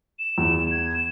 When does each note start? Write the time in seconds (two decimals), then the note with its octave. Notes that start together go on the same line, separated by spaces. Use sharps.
0.19 E7
0.38 E2
0.71 G#6
0.94 E7